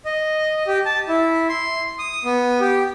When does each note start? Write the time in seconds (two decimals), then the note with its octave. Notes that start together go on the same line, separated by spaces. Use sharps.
0.05 D#5
0.67 G4
0.86 A5
1.08 E4
1.49 C6
1.99 D#6
2.24 B3
2.60 G4